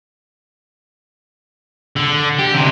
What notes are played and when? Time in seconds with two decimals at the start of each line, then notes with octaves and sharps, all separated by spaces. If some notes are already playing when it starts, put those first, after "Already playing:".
1.96 D3
2.39 G4
2.54 D2 C3